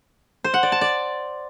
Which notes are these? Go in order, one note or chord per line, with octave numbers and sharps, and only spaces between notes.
C5
F#5
D5
A5
D5